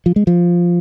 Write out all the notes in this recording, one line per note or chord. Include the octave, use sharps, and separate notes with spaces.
F3
G#3
F3